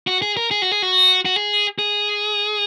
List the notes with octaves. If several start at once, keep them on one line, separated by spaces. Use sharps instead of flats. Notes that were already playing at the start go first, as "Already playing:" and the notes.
F#4
G#4
A#4
G#4
F#4
G#4
F#4
F#4
G#4
G#4